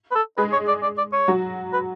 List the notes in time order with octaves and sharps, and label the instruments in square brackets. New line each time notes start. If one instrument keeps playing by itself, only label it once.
[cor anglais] B4
A4
[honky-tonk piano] G#3 G#4 [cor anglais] B4
[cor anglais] C#5
D5
D5
D5
C#5
[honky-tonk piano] F#3 F#4
[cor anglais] B4